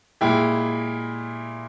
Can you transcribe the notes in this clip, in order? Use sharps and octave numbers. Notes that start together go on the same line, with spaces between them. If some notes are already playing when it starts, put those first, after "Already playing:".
A#2 G#3 E4 G4